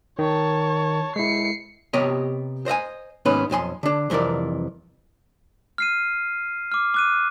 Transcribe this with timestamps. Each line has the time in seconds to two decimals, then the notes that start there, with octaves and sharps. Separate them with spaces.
0.19 D#3 C#5 A5
1.16 G#3 E4 C7 C#7
1.93 C3 B3 G4 C#5 D#5
2.66 C5 D#5 E5 G#5
3.25 D#2 G#2 B3 C#4 D#4 B4
3.50 B1 F2 G#5 C6
3.83 D3 D4
4.10 C2 F2 E3 A#4 D5
5.78 F6 C7 D#7
6.72 D6 F6
6.94 D6 F#6 D#7